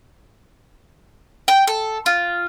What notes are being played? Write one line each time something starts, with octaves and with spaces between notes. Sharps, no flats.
G5
A4
F4